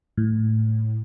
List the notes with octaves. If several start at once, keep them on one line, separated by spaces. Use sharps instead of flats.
A2